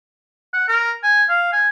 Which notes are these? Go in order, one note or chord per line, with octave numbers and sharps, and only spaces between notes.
F#5
A#4
G#5
F5
G#5